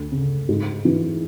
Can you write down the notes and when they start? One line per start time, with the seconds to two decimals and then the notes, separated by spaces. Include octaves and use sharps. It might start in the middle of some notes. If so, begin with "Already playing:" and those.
Already playing: D2
0.12 C#3
0.49 G#2
0.85 E3